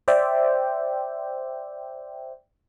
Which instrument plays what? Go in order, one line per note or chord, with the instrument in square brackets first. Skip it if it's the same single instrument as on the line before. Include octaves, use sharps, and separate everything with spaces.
[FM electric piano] C5 D5 E5 G5